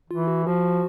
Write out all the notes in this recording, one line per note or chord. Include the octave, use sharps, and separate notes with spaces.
E3 F4
F#4
F3 F#4